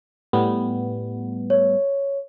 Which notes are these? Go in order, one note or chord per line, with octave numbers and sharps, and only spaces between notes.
A2 G3 B3
C#5